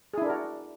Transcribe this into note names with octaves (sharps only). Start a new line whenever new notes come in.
D4 E4 F#4 G#4 A#4